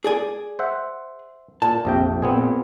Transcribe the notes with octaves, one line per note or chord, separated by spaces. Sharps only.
G#4 D5 G#5
C5 E5 F#5
A#2 A5
A#1 F2 C3 G5
A#2 B3 C4 G#4